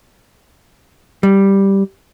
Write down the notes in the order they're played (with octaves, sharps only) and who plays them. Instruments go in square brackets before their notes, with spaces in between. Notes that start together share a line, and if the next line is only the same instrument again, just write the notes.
[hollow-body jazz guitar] G3